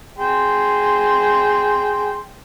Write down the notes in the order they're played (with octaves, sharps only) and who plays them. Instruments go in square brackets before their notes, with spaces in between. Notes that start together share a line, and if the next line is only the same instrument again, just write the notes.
[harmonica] G#4 G5 C6